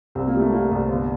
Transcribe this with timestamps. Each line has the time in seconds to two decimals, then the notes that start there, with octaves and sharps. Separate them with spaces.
0.15 C2 C4
0.27 A#3
0.34 G3
0.40 A3
0.52 G3 A#3
0.71 C2
0.89 G1